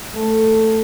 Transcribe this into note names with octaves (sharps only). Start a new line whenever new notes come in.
A3